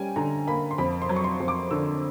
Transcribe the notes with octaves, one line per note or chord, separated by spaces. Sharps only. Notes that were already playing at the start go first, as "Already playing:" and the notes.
Already playing: G3 C#4 G5 G#5
D3 A#5
A#3 B5
C6
F2 B5
C6
F#3
C#6
C6
F2
D6
D3 E6